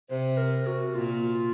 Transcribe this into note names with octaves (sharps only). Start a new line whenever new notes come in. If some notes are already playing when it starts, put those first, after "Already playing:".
C3 C5
A#4
F#4
A#2 F4